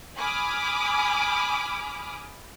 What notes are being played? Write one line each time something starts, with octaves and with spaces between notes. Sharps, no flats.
G#5 B5 D6 D#6 F6